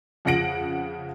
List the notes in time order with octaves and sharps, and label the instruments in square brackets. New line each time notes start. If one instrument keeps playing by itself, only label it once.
[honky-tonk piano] F2 C#3 F#5 A#6 D7 F#7